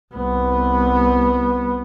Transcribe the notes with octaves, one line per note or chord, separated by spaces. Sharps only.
C2 B3